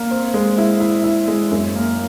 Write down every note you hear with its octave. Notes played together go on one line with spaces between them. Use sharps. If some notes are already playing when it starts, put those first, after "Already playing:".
Already playing: A#3
C4
G#3
E4
E4
E4
G#3
F#2
A#3